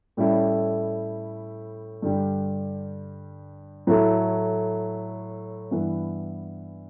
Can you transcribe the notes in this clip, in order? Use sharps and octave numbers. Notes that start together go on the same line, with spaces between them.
A2 G3 C#4 E4 A4
G2 D3 G3
A2 F#3 A3 E4 A4
G2 E3 B3